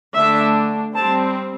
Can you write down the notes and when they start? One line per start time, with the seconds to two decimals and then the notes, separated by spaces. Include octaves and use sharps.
0.16 D3 A3 D4 E5
0.95 G3 C4 A5